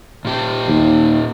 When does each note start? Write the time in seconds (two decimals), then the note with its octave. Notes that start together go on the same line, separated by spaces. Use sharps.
0.25 A#2 G4
0.68 D#2